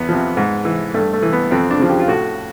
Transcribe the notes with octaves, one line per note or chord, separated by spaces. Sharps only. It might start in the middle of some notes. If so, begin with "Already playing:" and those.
Already playing: E2 B3
C3 F3
G#2
E3
G2 A3
A3
E3
B3
F2 C4
D4
C#3 F3
G4
F4
A2 F#4